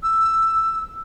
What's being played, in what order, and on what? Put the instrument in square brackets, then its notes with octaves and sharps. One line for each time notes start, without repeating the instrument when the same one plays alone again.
[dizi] E6